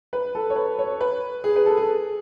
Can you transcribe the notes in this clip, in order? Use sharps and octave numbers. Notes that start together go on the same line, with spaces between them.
B4
A4
C#5
B4
C#5
B4
G#4
B4
A4
G#4